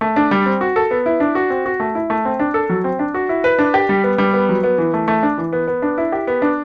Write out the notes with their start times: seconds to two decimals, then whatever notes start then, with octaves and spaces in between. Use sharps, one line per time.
0.01 A3
0.16 D4
0.31 G3
0.46 C4
0.61 F#4
0.76 A4
0.91 B3
1.06 E4
1.20 D4
1.35 F#4
1.50 C4
1.66 F#4
1.80 A3
1.95 E4
2.10 A3
2.25 C4
2.39 D4
2.54 A4
2.69 F#3
2.84 C4
2.99 D4
3.14 F#4
3.29 E4
3.44 B4
3.59 D4
3.74 G4
3.89 G3
4.04 B3
4.18 G3
4.33 B3
4.49 F#3
4.63 B3
4.78 E3
4.94 A3
5.08 A3
5.23 D4
5.38 E3
5.53 B3
5.67 B3
5.82 D4
5.98 E4
6.12 G4
6.27 B3
6.42 D4